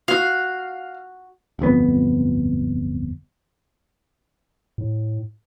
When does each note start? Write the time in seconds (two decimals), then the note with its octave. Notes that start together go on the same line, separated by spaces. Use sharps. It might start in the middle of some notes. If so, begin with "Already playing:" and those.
0.08 F#4 F5
1.59 D1 G1 F2 B3
4.78 A2